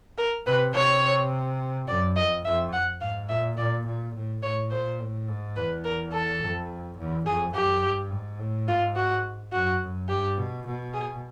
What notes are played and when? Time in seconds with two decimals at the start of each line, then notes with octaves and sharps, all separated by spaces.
0.18 A#4
0.46 C3 B4
0.74 C3 C#5
1.88 F#2 D5
2.16 F2 D#5
2.45 F2 E5
2.73 F#5
3.01 G#2 F5
3.29 A#2 E5
3.57 A#2 D5
3.86 A#2
4.14 A2
4.43 A2 C#5
4.71 A#2 C5
4.99 A2
5.28 G#2
5.56 E2 B4
5.85 A#4
6.13 A4
6.41 F2
6.98 E2
7.26 F2 G#4
7.55 F#2 G4
7.83 G2
8.11 G#2
8.39 A2
8.67 G#2 F4
8.96 F#4
9.52 F#2 F#4
9.81 F#2
10.09 G2 G4
10.37 B2
10.66 B2
10.94 G#4